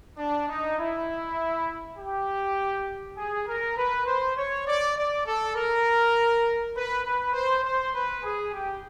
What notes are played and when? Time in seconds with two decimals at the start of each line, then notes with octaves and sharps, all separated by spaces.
0.18 D4
0.49 D#4
0.79 E4
1.97 G4
3.16 G#4
3.47 A#4
3.76 B4
4.06 C5
4.36 C#5
4.66 D5
4.96 D5
5.26 A4
5.55 A#4
6.75 B4
7.04 B4
7.33 C5
7.63 C5
7.94 B4
8.23 G#4
8.53 G4